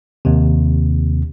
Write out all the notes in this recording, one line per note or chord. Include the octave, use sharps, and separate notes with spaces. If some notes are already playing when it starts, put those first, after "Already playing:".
D#2 C3